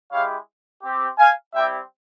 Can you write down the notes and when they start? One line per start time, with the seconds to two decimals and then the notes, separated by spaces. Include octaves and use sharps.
0.11 G#3 E4 G4 C#5 F5
0.83 C4 G4
1.18 F5 G#5
1.54 G3 C4 E4 G4 E5 G5